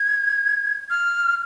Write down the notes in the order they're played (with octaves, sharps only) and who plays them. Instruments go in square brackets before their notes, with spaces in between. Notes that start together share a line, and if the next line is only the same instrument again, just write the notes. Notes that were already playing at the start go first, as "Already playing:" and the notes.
Already playing: [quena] G#6
F6